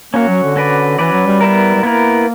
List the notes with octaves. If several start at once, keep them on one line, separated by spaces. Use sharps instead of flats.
A#3 C#4 F#4 C#5
F#3
D3
C#4 F#4 B4 D5
E3 C#4 F#4 B4 D5
F#3
G3
B3 E4 A#4
G3
A#3 B3 E4 A#4